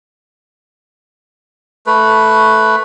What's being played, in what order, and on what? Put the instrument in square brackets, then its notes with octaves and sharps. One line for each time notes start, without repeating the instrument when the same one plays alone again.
[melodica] A3 B4